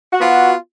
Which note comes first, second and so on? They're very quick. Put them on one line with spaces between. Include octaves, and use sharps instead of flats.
F#4 B3 F4